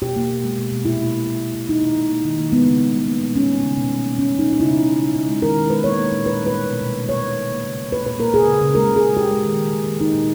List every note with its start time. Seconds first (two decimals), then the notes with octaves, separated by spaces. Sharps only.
0.02 B2 G4
0.16 A#3
0.30 B2
0.44 G#3
0.58 B2
0.72 B2
0.85 A#2 E4
1.00 A#3
1.13 A#2
1.27 B2
1.41 A#3
1.55 B2
1.69 B2 D#4
1.83 B2
1.96 B2
2.11 A#3
2.25 D#3
2.38 A#3
2.51 G#3 B3
2.66 C#3
2.80 G#3
2.93 G3
3.07 A#3
3.21 A#2
3.35 G#3 C#4
3.49 G#3
3.63 C#3
3.77 B2
3.90 G3
4.05 A#3
4.18 B2 C#4
4.32 B2
4.39 D#4
4.45 B2
4.52 D#4
4.60 C#3 E4
4.73 E3
4.87 C#3
5.01 C#3
5.15 C#3
5.29 G#3
5.42 D#3 A#4
5.57 D#3
5.70 G#3 B4
5.84 A#3 C#5
5.98 A#3
6.12 A#2
6.26 A#2 B4
6.40 G3
6.47 B4
6.54 A#2
6.68 B2
6.82 B2
6.96 A#3
7.09 A#3 C#5
7.23 B2
7.37 G3
7.51 A#3
7.65 C#3
7.78 C#3
7.92 A#3 B4
8.06 A#2 B4
8.20 A#3 A#4
8.33 C#3 G#4
8.48 C#3
8.61 C#3
8.75 G#3 A#4
8.90 G#3
8.96 G#4
9.03 C#3
9.17 G#3 G4
9.31 G#3
9.45 D#3
9.59 A#3
9.73 D#3
9.86 D#3
10.00 A#3 D#4
10.14 A#2